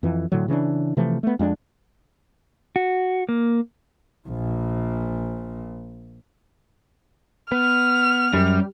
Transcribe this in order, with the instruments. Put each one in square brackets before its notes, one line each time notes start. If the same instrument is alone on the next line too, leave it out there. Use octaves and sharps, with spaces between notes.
[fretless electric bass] F2 E3
A2 D3 F#3
C#3 E3 C4 D4
C3 E3 F3 A3
A3 B3
F2 G#3 C4 D4
[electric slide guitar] F#4
A#3
[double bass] A#1 A#2
[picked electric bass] B3 [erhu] F6
[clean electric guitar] F#2 [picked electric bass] G3